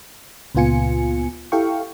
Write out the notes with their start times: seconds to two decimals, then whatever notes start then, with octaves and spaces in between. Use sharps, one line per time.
0.55 C#2 A#2 B3 F4 G#5 C#7
1.52 E4 G4 A4 F5 G5 C#6